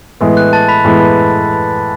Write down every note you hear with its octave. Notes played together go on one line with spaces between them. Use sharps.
A2 E3 G#3 B3
F#6
A5 A6
B5 B6
A2 E3 G#3 B3